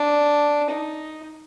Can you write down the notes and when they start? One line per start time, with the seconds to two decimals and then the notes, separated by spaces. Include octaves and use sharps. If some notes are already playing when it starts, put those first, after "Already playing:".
Already playing: D4
0.70 D#4